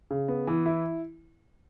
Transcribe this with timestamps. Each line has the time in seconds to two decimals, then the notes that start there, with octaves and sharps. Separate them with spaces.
0.11 C#3
0.28 B3
0.47 E3
0.66 E4